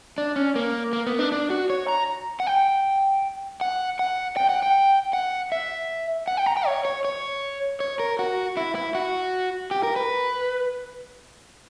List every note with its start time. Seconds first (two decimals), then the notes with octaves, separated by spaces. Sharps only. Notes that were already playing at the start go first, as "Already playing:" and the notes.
0.18 D4
0.36 C#4
0.56 A#3
0.93 A#3
1.07 B3
1.19 D4
1.32 D4
1.50 F#4
1.70 C#5
1.88 A#5
2.40 F#5
2.47 G5
3.61 F#5
3.99 F#5
4.37 G5
4.49 F#5
4.63 G5
5.13 F#5
5.52 E5
6.28 F#5
6.37 G5
6.46 A#5
6.57 G5
6.66 C#5
6.85 C#5
7.05 C#5
7.80 C#5
7.99 A#4
8.19 F#4
8.57 E4
8.75 E4
8.95 F#4
9.71 G4
9.83 A#4
9.96 B4